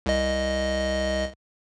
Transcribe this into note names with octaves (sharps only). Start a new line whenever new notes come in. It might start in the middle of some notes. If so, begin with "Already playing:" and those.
C2 D#5